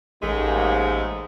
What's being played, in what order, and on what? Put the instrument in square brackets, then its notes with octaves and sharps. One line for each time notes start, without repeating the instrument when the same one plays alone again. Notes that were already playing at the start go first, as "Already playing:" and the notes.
[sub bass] A1 [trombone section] D#2 G#2 [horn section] G#3 A3